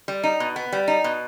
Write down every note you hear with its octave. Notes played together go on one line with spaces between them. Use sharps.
G3
D#4
B2
B3
G3
D#4
B2